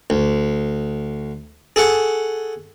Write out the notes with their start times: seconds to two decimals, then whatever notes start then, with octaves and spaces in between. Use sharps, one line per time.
0.10 D2
1.76 G#4 A4 F#5 C#6